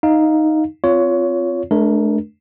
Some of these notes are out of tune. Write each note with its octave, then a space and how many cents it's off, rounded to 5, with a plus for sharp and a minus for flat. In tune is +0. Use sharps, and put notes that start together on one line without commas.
D#4 +0 F5 +0
C4 -10 F4 +0 C#5 +20
A3 -35 D4 +0 A#4 +15